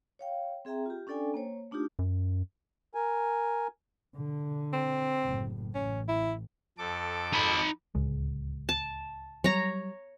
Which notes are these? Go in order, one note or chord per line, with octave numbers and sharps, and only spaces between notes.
C#5 F5 G5
C4 G#4 E5 G5 A#5
F4 G4
C#4 D4 A4 D5 G5 G#5
A#3 C5 C#5
A3 D4 D#4 F4 G4
F#2
A#4 G#5
D3
C4
F#1 A2
A1 C#4
E4
F2 A4 D6
D#4 B5
D1 C#2 G#3
A5
F#3 G3 C#5 A#5